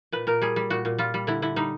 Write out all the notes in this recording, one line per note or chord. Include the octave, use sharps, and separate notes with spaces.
A#2 B4
A#2 A#4
G3 G#4
G3
A#2 F#4
A#2
G3 F4
G3
D3 E4
D3 E4
G3 D#4